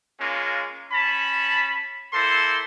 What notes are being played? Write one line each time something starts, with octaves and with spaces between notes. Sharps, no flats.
G#3 A#3 C#4 F4
C#4 A5 B5
A#3 E4 A4 C5 C6